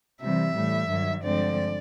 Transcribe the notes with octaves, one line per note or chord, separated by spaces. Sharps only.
C3 E3 G3 E5
A2 E3 G3
G2 D#3 F#3
G2 D3 F3 G#3 C4 D5